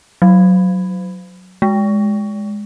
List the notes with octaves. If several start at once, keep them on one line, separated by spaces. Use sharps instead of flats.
F#3
G#3